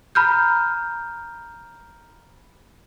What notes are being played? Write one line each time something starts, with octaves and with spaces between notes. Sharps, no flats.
A#5 B5 F6 G6